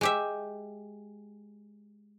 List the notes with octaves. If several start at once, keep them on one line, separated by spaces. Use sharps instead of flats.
G#3 G4 E5